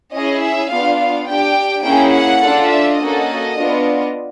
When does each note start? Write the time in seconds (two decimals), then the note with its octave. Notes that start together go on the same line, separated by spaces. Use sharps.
0.13 C#4 E4 G#4 D#5
0.42 E5
0.70 B3 D4 F4 F5
0.99 F5
1.27 D4 G4 G5
1.85 A#3 C#4 E4 G#4 G5
2.13 F#5
2.42 D4 F4 A4
2.70 E5
2.99 A#3 C#4 F#4 A4 D#5
3.56 B3 D4 F4